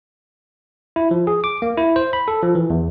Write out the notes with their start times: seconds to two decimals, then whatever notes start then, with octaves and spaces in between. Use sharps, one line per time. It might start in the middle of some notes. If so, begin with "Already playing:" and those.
0.96 E4
1.11 F3
1.27 G#4
1.44 D6
1.62 A#3
1.77 E4
1.96 C5
2.13 B5
2.28 A4
2.43 F3
2.55 E3
2.70 E2